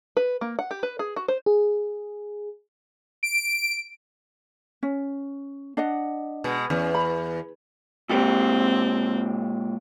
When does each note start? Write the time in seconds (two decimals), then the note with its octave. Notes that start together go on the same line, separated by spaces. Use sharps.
0.17 B4
0.41 A#3
0.59 F#5
0.71 G4
0.83 B4
0.99 G#4
1.16 F#4
1.28 C5
1.46 G#4
3.23 D7
4.83 C#4
5.77 D4 D#5 F#5
6.44 B2 G#3
6.70 E2 C#4
6.95 B5
8.10 A#2 G#3 C4 G4